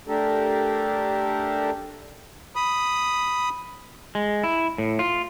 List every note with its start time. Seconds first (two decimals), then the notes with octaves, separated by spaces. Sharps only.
0.08 A3 D4 G4 A4 A#4
2.56 B5 D#6
4.15 G#3
4.44 E4
4.78 A2
4.99 F4